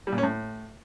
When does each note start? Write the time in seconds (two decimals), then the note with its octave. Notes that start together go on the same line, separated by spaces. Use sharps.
0.07 G3
0.12 A#2
0.18 C#4
0.23 A2